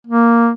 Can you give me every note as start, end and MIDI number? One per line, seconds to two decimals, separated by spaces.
0.06 0.51 58